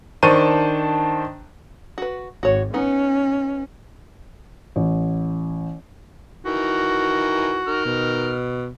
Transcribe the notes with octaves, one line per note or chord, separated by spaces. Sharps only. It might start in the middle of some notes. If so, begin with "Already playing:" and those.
D#3 D4 C5 A5 C#6 D#7
F#4 B4
G#1 F#4 C#5
B3 C#4 D#4
A1
D#3 E3 F#4
D#3 F6
B2